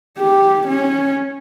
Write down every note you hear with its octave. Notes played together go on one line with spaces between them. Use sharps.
G4
C#4